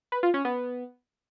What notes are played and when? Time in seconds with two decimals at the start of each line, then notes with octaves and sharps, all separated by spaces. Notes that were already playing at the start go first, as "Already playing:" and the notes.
0.12 B4
0.23 F4
0.34 C#4
0.45 B3